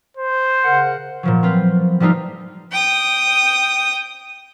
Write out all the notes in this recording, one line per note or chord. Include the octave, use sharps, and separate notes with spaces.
C5
C#3 A#4 F#5
A#2 F3 F#3
C4 F4 B4
F3 G3 A3 D#4 F4
G5 D#6